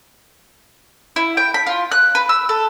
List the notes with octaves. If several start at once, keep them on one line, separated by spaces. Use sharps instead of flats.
E4
G5
B5
F4
F#6
B4
E6
A4